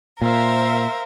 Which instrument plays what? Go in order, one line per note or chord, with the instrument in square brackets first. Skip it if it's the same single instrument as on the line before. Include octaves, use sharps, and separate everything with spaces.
[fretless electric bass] A#2 [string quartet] A#4 [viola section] C5 E5 F5